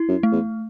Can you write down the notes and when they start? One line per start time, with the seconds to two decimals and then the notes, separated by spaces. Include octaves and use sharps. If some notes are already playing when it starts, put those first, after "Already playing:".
Already playing: E4
0.08 F#2
0.23 A3
0.32 E2